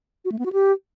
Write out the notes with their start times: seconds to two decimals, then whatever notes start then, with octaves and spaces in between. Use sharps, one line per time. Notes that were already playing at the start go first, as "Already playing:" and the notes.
0.25 F#4
0.32 A3
0.39 B3
0.46 F#4
0.53 G4